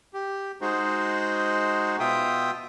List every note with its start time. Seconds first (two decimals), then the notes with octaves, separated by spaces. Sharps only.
0.14 G4
0.61 G#3 D#4 F#4 G#4 C5
2.00 B2 F4 E5 G5 D#6